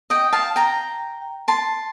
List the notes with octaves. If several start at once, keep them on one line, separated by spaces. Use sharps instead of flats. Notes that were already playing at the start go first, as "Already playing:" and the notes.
D#5 G5
F5 A5
G5 A#5
A5 C6